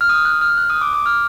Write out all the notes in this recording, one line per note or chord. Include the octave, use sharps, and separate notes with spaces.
F6
D#6
F#6
F6
F#6
D#6
D6
D6
F6